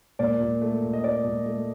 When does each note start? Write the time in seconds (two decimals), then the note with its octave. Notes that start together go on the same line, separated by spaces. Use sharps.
0.19 A#2 D5
0.40 A#2
0.62 A3
0.82 A#2
0.93 D#5
1.03 A#2 D5
1.24 A#2
1.46 A3